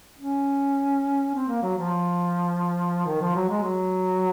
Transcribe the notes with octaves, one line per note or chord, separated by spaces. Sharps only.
C#4
C4
A#3
F#3
F3
D#3
F3
F#3
G#3
F#3